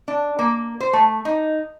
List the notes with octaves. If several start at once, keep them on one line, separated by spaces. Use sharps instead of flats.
D4
A#3
C5
A3
D#4